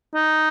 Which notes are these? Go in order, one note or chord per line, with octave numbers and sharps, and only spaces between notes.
D#4